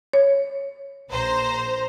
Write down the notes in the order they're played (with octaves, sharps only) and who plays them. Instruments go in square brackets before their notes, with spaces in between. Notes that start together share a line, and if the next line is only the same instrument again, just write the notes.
[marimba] C#5
[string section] A#1 C5 A#5